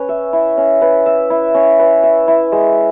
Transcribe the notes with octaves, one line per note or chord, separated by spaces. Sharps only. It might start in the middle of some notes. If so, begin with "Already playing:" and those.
Already playing: C#4 B4
E5
E4
C#4
B4
E5
E4
C#4
B4
E5
E4
G#3